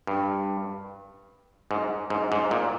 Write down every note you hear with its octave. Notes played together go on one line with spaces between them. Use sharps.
G2
G#2
G#2
G#2
A#2